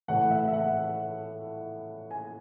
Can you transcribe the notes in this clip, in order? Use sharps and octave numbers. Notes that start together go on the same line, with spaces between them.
A2 E3 A3 F#5
E5
E5
F#5
G#5